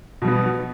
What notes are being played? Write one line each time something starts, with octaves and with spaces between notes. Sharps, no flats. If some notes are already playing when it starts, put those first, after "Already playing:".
B2 G3 B3